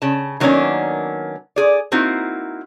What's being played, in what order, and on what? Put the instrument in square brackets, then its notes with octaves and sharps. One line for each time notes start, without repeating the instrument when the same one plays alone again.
[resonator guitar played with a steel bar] C#3 A5
D#3 F#3 A#3 B3 C#4 D4
G#4 D5
A#3 C4 D#4 E4 F#4